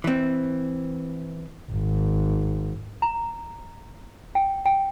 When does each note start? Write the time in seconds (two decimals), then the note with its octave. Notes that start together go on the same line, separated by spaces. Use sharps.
0.04 E3 C4
1.71 G#1
3.02 A#5
4.35 G5
4.65 G5